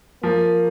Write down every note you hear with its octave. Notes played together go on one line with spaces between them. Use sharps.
F3 A#3